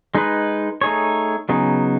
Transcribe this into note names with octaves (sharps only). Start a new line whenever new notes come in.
G#3 D#4 G#4 B4
A3 D#4 G#4 C#5
C#3 F#3 B3 D#4 G#4